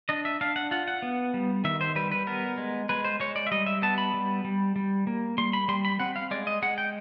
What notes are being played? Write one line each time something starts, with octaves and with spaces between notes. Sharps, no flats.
D4 D#5
E5
D4 F5
F#5
F4 F#5
F#5
B3
G3
D#3 E5
C5
G3 B4
B4
B3 A#4
G#3
G#3 B4
C5
G#3 C#5
D5
E5
G3 D#5
E5
B3 A5
B5
G3
G3
G3
A#3
G3 C6
B5
G3 C6
B5
C4 F#5
F5
G#3 D5
D#5
G#3 F#5
G5